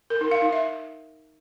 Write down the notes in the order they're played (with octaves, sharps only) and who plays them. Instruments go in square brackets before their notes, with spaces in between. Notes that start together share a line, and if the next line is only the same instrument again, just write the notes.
[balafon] A#4
D#4
F5
D#4
E5